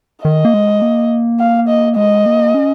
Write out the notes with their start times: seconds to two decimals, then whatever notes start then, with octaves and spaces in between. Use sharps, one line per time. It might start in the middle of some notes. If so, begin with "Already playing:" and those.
0.25 D#3 D#5
0.45 A#3
0.54 G#3
0.82 A#3
1.40 F5
1.68 D#5
1.96 G#3 D#5
2.26 A#3
2.54 C#4